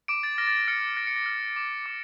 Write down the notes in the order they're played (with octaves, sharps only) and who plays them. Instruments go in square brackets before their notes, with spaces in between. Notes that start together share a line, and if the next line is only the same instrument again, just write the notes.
[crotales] D6 D7
A6
F6 A#6
A6
A#6
F6 C#7
F6 A#6
C#7
A#6
F6
D6
D6